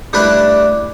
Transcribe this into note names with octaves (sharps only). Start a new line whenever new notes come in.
G3 A3 D4 E4 B4 D5